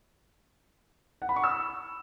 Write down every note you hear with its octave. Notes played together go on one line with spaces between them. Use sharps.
F#5
B5
C#6
E6